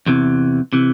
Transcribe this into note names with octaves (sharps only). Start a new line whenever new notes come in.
E2 C3 E3
C3 E3